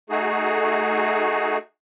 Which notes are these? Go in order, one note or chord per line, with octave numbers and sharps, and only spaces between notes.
A3 D#4 F#4 G#4